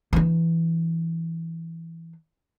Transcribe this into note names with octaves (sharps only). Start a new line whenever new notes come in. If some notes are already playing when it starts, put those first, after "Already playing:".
E3 D4